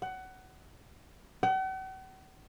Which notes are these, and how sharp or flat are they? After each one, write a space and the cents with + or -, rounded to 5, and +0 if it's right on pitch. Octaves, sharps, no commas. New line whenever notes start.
F#5 +20
F#5 +45